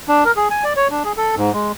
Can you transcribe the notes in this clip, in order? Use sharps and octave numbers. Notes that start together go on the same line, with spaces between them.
D4
A#4
G#4
G#5
D5
C#5
D4
G#4
A4
G#2
G#3